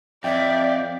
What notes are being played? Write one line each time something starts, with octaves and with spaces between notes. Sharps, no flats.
F2 D5 E5 G5